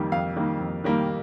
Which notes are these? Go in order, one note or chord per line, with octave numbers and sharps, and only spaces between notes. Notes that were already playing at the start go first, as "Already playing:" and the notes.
Already playing: F2 D#3 G3 A#3
F2 F5
D#3 G3 A#3
F2
D#3 G3 A#3